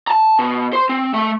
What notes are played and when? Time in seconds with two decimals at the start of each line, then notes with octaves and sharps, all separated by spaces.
0.07 A5 A#5
0.39 B2
0.73 C5 C6
0.89 C4
1.14 A3 E5